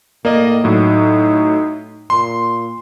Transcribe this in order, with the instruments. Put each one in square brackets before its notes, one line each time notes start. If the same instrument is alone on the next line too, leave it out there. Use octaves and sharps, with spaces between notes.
[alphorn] A2 [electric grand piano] A#3 D5 D#5
[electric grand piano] A2 F#3 [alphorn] D#4
[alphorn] A#2 [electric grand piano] C6